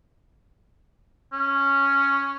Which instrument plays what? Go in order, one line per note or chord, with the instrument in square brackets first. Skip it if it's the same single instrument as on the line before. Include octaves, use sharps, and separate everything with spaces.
[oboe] C#4